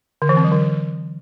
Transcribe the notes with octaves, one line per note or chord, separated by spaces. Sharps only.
D3
E3
C4
F#3
D3